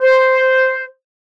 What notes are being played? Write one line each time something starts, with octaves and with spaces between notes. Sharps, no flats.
C5